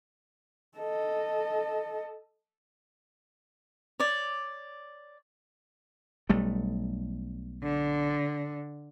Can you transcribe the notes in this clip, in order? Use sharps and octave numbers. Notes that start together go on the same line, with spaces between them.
A4 D#5
C#5 D5
B1 G3 A3
D3